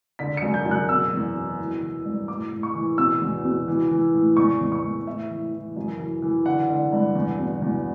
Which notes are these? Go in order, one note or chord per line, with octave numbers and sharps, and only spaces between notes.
D3 B6
F#2 C#7
G6
F#2
F#6
B2 E6
E2
B2
E3
E3
G2
A2 D6
A2
C#6
E3
B2 E6
E2
B2
E3
E3
A2
E2 C#6
E2
C#6
E2
A2 E5
E3
E3
F#2
E3
E3
D3 F#5
D3
G2
E2
B2
E2